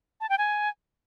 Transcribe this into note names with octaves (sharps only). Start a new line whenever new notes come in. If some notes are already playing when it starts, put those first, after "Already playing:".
A5
G5
G#5